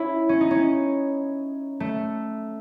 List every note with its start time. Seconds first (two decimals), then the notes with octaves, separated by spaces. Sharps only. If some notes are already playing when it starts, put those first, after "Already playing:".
Already playing: C#4 E4
0.29 C#4
0.41 D#4
0.51 C#4
1.80 A3